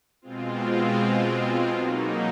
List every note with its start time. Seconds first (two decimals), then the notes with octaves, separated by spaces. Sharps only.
0.22 B2 G#3 C4 F4
1.72 B2 F#3 A#3 D#4